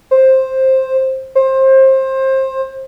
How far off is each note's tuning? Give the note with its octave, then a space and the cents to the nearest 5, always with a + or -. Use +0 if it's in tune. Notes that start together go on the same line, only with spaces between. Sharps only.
C5 +10
C5 +25